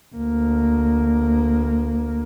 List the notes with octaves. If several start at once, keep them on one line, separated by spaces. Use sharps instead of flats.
D2 A#3